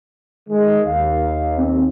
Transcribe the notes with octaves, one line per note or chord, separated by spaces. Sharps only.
D#3 G#3
D#2 F5
C4